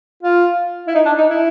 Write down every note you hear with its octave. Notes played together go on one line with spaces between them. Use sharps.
F4
E4
D#4
D4
D#4
E4